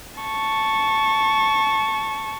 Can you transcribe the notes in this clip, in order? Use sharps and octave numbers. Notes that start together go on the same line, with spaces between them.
A5 C#6